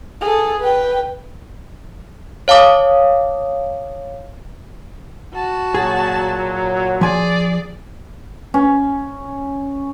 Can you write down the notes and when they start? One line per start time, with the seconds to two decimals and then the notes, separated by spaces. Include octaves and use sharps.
0.21 G#4 A4
0.60 B4 G5
2.48 C#5 F5 A5 D6 D#6
5.33 F#4 A5
5.75 A#2 F#3 G#4
7.01 F3 G#4 D5 G#5
8.54 C#4